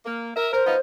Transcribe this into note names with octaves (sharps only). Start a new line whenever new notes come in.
A#3
A#4 E5
A#4 C5
B3 D#4 F4